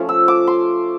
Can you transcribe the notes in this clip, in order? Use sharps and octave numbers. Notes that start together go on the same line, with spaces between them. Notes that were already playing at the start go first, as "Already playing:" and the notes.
Already playing: F3 A3 C#4
E6
D6
C6